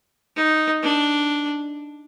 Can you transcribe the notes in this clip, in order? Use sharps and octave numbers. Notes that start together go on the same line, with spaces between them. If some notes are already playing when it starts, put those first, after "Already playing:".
D#4
D4